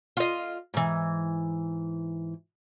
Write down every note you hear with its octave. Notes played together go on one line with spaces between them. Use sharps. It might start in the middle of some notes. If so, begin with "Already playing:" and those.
F4 D#5
G#2 E3